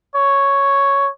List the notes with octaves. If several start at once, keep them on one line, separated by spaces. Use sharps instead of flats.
C#5